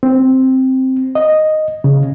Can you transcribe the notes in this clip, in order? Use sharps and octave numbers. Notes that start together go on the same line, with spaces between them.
C4
D#5
C#3